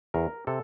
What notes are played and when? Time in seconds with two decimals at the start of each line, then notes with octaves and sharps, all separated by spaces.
0.14 E2 A#4
0.47 C3 A4